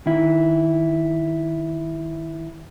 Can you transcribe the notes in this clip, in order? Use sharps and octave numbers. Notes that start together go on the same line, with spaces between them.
D#3 E4